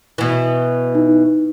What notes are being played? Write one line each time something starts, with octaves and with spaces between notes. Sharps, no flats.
B2 E3
D#4